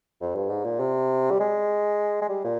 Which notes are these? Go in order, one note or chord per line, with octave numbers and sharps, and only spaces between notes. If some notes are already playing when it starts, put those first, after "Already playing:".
F2
G2
G#2
A#2
C3
G3
G#3
G#3
G3
A#2